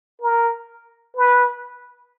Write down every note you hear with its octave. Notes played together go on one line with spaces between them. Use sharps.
A#4
B4